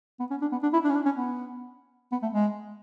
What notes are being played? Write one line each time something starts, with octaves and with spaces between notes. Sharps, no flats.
B3
C#4
D4
B3
D4
E4
D4
C#4
D4
C#4
B3
B3
A3
G#3